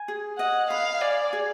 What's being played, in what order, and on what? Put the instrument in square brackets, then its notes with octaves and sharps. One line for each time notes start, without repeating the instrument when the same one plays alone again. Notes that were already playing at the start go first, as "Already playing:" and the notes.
Already playing: [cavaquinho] G#5
G#4
[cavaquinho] D#5 [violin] F#5
[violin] F5 [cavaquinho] B5
[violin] D5 [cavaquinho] G#5
[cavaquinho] G#4